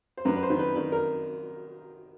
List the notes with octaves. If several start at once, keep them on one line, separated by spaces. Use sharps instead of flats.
C5
F#2 B4
B4
C5
D#3
B4
D#3 B4
A#4